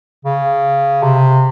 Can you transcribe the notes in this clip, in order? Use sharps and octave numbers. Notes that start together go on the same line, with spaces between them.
C#3
C3